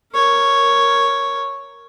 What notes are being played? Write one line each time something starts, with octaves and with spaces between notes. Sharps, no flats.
A#4 C#5